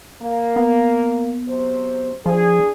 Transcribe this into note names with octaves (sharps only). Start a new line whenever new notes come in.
A#3
B3
C3 F#3 C5
E2 F3 D4 G#4